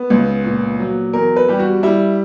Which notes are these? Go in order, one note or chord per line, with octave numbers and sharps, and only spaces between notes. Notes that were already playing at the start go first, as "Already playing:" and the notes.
Already playing: B3
C#2
A#2
F#3
E2 A#4
B4
G3 G4
F#4
G3 E4